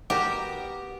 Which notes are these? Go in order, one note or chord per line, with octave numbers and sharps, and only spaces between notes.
B3 F#4 G4 A#4